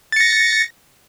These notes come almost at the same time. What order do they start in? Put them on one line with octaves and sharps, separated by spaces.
A6 C#7 A#6